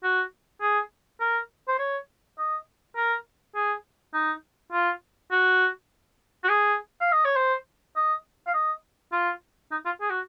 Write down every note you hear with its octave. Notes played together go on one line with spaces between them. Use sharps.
F#4
G#4
A#4
C5
C#5
D#5
A#4
G#4
D#4
F4
F#4
F#4
G#4
F5
D#5
C#5
C5
D#5
F5
D#5
F4
D#4
F4
G#4
F#4